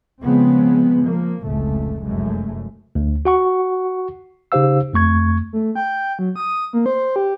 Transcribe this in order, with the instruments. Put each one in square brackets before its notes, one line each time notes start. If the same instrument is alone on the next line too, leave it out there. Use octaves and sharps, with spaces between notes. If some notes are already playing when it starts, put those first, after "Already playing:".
[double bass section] C#3 F3 G#3 B3 C4
F3 A#3
F1 C#2 A2 A3
F1 F#2 G#3 A3
[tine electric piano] D2
F#4 F#5 C#6
C#3 D#4 G4 C5 F5 E6
F2 A3 C#6 G#6
[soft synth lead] A3
G5
F#3
D#6
A#3
C5
G4